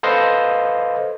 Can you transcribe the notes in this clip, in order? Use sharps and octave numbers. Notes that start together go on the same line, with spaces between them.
A4 B4 C5 D#5 F5